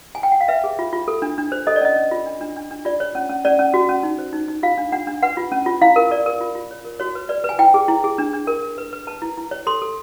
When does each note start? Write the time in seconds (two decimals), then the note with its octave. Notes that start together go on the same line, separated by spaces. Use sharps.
0.15 G#5
0.23 G5
0.32 F#5
0.41 F5
0.48 B4 E5
0.64 G#4
0.79 F4
0.93 F4
1.08 A4
1.22 D4
1.38 D4
1.52 C5
1.67 A4 D#5
1.76 D5
1.81 C#4 D#5
1.96 C#4
2.11 F4
2.26 D4
2.41 D4
2.56 D4
2.71 D4
2.85 F4 D5
3.00 C#5
3.15 C#4
3.29 C#4
3.45 C#4 D5
3.59 C#4
3.74 F#4
3.89 C#4
4.03 D#4
4.19 C5
4.33 D#4
4.48 D#4
4.63 F4 F5
4.78 D4
4.92 D4 F#5
5.07 D4
5.23 B4 F#5
5.37 F4
5.52 C#4
5.66 F4
5.82 E4 F5
5.96 A#4
6.11 A#4 D5
6.26 A#4
6.41 F4
6.55 F4
6.71 C#5
6.85 A#4
7.00 F#4 C#5
7.15 B4
7.29 B4 D5
7.44 B4 G#5
7.59 E4 G5
7.74 G#4
7.88 E4
8.04 G#4
8.18 D4
8.33 D4
8.47 A#4
8.63 A#4
8.78 B4
8.93 B4
9.07 B4 A5
9.22 E4
9.37 E4
9.51 C#5
9.67 A4 C6
9.82 A4